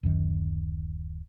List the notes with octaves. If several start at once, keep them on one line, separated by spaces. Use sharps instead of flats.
D1 F#2 D#3